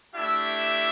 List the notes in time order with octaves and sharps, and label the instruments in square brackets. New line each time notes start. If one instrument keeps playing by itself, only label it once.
[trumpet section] A3 D4 E4 G4 E5